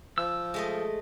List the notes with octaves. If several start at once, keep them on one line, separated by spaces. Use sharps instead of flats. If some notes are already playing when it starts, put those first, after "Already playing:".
F3 E6
G#3 A3 D#5